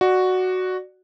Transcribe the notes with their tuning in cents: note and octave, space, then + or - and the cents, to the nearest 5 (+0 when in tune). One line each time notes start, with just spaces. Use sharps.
F#4 +0 D5 +20